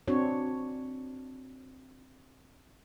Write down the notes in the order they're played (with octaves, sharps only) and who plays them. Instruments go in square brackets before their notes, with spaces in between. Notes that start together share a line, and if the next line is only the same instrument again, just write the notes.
[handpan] C4 D4 F#4 C#5